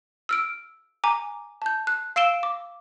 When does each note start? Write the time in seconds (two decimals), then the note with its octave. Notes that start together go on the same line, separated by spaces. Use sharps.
0.29 E6 F6 D7
1.04 G#5 A#5 D6
1.62 A5 G6
1.87 F#6
2.16 F5 E6 D7 E7 G7
2.43 D6